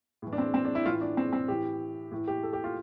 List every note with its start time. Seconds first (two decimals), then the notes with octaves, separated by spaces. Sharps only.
0.22 A2 E3
0.33 D4
0.38 C4
0.54 C4
0.65 D4
0.75 E4
0.86 A2 E3 F4
1.01 D4
1.17 C4
1.33 C4
1.48 A2 E3 G4
2.11 A2 E3
2.28 G4
2.43 A4
2.53 G4
2.64 F4